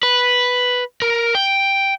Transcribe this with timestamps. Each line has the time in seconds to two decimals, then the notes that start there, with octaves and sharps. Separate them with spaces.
0.03 B4
1.02 A#4
1.35 G5